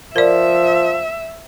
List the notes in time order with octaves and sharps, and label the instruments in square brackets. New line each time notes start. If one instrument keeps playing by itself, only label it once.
[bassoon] F3 [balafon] A#4 D5 [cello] E5